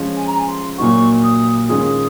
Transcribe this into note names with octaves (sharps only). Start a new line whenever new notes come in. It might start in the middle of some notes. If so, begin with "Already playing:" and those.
Already playing: F3 G#3 C#4 F4
G#5
A#5
G#5
C6
A#2 F#3 A#3 D#4 F#4 C#6
D#6
D#3 G#3 C#4 F4 G#4 D#6